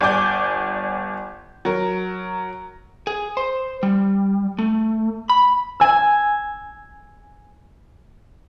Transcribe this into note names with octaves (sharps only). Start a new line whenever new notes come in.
G1 D5 G#5 D6 G6
F#3 A#4
G#4
C5
G3
A3
B5
G#5 E6